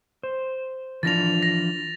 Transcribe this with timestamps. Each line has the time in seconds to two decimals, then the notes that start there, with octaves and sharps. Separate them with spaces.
0.23 C5
1.03 E3 F3 D4 A6 A#6 F7
1.43 A#6